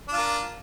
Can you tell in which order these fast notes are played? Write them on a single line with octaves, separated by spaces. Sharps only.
D4 F4 A#4